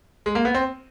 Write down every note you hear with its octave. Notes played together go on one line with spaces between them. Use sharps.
G#3
A#3
B3
C4